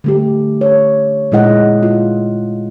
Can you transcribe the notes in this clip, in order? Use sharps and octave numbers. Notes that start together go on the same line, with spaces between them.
D3 A3 G4
C#5
A#2 G#3 E4 D#5 F#5
F4